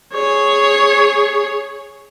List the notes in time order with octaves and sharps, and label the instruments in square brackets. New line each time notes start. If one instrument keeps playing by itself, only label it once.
[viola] G#4 C#5